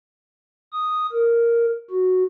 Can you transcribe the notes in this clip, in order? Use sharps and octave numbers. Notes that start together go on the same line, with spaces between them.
D#6
A#4
F#4